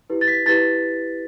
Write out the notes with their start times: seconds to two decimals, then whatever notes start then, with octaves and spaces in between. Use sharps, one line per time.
0.10 E4 G4 B4
0.21 A6
0.28 B6
0.46 E4 G4 B4 A6